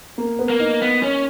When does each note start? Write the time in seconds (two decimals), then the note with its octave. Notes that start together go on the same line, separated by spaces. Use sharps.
0.18 A#3
0.39 B3
0.50 A#3
0.60 D#4
0.82 B3
1.03 C#4